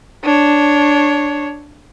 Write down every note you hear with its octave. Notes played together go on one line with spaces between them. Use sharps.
D4 C#5